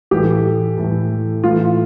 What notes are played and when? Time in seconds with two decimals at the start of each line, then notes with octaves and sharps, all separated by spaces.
0.11 A2 E3 A3 G4
0.77 A2 E3 A3
1.43 A2 E3 A3 F4